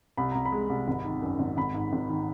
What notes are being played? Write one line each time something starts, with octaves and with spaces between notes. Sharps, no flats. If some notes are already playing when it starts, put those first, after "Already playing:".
C2 B5
C2 A#5
B5
G#3
C2
G#1
D#3
F#2
G#1
G#1 B5
G#2
G#1
D#3